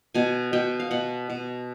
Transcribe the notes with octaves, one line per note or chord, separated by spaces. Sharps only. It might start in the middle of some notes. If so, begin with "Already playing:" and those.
B2 G#5
B2 G5
F5
B2 F#5
B2